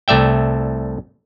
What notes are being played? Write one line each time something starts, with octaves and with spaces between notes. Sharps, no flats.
C2 A3 D5 E5 G5